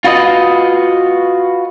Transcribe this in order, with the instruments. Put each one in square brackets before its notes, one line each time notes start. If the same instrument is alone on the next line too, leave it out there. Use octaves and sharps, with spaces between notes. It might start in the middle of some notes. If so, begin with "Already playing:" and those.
[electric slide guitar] F4 F#4 B4 C#5 D#5